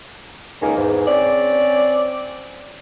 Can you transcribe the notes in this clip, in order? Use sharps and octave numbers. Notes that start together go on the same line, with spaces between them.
C#2 D#3 A#3 D#4 G#5
E2 G#2
C4 C#4 D5